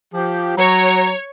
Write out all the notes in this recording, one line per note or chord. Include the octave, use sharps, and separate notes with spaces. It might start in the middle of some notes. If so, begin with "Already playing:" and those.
F3 G4
F#3 C#5 A#5